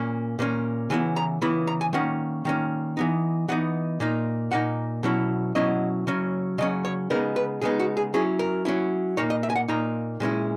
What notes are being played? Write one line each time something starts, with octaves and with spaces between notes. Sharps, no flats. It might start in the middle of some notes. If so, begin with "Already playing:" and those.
Already playing: A#2 A#3 C#4
A#2 A#3 C#4
C#3 E3 B3 E4 G#5
A#5
C#3 E3 B3 E4 B5
A#5
G#5
D#3 A#3 C#4 F#5
D#3 A#3 C#4
E3 B3 D#4
E3 B3 D#4 F#5
A#2 A#3 D#4
A#2 A#3 D#4 F#5
B2 F#3 C#4 E4
B2 F#3 C#4 E4 D#5
C#3 F#3 C#4
C#3 F#3 C#4 D#5
C#5
C#3 G#3 B3 D#4 A#4
B4
C#3 G#3 B3 D#4 G#4
F#4
G#4
F#3 C#4 E4 G#4
A#4
F#3 C#4 E4
A#2 A#3 D#4 C#5
D#5
E5
G#5
F#5
A#2 A#3 D#4 A#5
A#2 G#3 C#4 E4